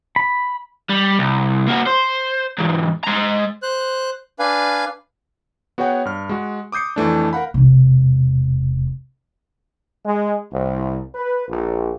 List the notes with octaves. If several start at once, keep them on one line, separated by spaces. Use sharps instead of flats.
B5
G3
C2
A#3 F#4
C5
E2 G#2
G#3 A#5
C5 F#6
D4 B4 F5 G#5
B3 F#4 G#4 C#5 F#5 G5
G2 F6
G#3 F#4
D6 D#6 G6 C7 C#7
F2 E3 A3 D4
A#4 F5 F#5 B5
E1 C3
G#3
C2
B4
A#1